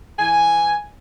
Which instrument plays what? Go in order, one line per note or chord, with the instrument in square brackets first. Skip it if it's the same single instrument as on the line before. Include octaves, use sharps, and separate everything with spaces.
[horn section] E3 G#5